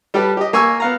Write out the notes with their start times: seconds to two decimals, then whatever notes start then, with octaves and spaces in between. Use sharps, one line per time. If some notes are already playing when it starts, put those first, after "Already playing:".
0.14 G3 G4 A4 B4
0.37 G4 D#5
0.53 A#3 G#5 C#6 E6
0.80 B3 F5 A#5